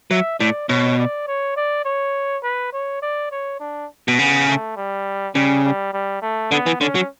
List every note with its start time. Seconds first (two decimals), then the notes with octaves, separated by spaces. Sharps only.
0.11 F#3 E5
0.39 A2 D5
0.69 B2 C#5
0.99 D5
1.27 C#5
1.56 D5
1.85 C#5
2.43 B4
2.73 C#5
3.02 D5
3.31 C#5
3.60 D4
4.08 B2
4.19 C#3 B3
4.48 A3
4.76 G3
5.35 C#3 G3
5.65 G3
5.93 G3
6.22 A3
6.52 D3 B3
6.66 E3
6.81 D3 C#4
6.95 F#3